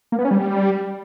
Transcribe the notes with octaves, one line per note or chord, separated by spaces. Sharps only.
A#3
B3
C#4
G3